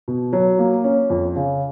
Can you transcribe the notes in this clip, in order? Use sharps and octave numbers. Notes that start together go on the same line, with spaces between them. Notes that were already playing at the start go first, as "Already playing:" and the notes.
B2
F#3
A#3
C#4
F2
C#3